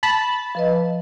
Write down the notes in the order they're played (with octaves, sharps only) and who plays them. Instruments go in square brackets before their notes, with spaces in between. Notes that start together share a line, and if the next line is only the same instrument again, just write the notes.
[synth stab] A5 B5
[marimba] F3 B4 D#5